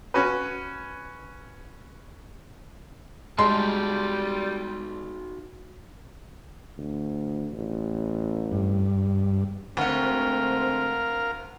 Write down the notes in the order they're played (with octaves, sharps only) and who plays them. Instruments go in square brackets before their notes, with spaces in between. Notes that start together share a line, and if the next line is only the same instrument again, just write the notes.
[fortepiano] C#4 F#4 B4
[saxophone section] G3 [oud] G#3 [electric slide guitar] D#4 F#4 A5 [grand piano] C6
[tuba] D2
A1
[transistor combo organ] G2
[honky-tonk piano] D2 [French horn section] G#2 A3 C4 [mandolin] F#4 F#5 [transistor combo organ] A#4 F5